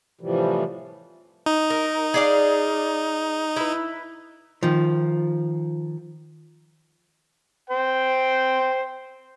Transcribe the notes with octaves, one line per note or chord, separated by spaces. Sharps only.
A2 C3 E3 F3 G3
D#4
A#4
G#4 D5 F5
E4 B4
D#3 F3
C5 G5